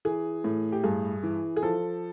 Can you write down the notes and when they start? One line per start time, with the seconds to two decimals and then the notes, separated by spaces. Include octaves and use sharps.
0.05 E3 G#4
0.44 A2
0.72 G4
0.84 G2 G#4
1.23 E3
1.56 G#4
1.63 F3 A4